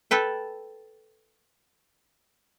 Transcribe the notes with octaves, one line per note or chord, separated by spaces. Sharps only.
A4 B4 G5